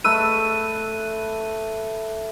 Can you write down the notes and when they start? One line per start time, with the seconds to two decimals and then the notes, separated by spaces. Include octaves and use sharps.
0.04 A3 B4 E6 D#7